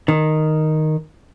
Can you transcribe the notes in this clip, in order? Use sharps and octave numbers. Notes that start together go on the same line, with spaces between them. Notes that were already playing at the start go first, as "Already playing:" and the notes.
D#3